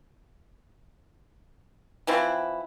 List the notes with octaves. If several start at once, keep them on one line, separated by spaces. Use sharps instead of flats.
E3 F3 C4 E4